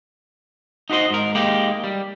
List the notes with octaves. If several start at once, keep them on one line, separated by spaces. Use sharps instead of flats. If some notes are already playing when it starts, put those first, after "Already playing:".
D#4 F#4 G4 C5 D#5
G#2 A#4
G#3 A#3 D#4 G4
G3